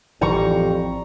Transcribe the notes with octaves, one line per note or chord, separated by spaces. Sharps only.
A1 F2 E3 G3 A#5 C#6